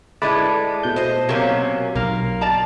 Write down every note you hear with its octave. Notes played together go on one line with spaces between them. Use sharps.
A2 G#3 A3 B4 D5 A5
B2 G6
C5 D#5
C3 F#3 A#3 C#4
B1 A#3 F6
D5 A5 A#5